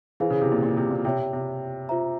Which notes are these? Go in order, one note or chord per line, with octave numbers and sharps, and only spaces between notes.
E3 E4 G#4 C5 F5 G#5
C#3
C3
A#2
A#2
C3
A#2
C3 C#5 E5 G5
C3
C3
F4 C5 E5 A#5